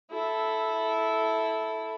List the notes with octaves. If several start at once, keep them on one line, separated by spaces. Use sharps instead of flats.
E4 A4